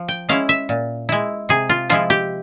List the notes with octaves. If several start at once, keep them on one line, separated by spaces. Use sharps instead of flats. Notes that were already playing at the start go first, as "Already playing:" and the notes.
Already playing: F3
G5
G#3 C#4 E4 F5
E5
A#2
G#3 E4
C3 G#4
F4
F3 G#3 E4 F4
G4